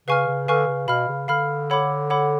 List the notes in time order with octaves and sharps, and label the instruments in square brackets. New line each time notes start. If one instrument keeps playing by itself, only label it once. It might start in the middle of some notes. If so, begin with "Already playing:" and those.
[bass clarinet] C#3 [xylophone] B4 F5 G#5 C#6 F6
[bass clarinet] C#3
[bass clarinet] D3 [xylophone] B4 F5 G#5 C#6 F6
[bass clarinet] C#3
[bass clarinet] B2 [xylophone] F5 B5 F6
[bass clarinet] C#3
[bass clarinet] D3 [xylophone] F5 B5 F6
[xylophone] A4 C#5 F#5 B5 D6
A4 C#5 F#5 B5 D6